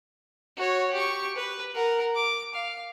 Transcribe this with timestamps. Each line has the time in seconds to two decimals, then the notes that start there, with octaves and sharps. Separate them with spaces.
0.57 F#4 C#5
0.93 G4 C#6
1.36 B4
1.75 A#4 F#5
2.15 D6
2.54 F5